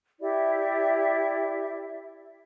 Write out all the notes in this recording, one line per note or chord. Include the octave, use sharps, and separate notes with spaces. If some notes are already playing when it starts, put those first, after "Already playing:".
E4 G4 D5 E5